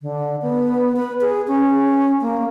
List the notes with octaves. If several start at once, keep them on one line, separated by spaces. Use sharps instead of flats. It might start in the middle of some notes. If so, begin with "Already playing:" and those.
D3
B3
B4
G#4
C#4
A#3